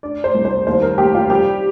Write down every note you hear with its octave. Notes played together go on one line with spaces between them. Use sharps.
D4 D5
C5
C2
C5
D#2 C5
A#4
A#3 G4
F4
G3 G4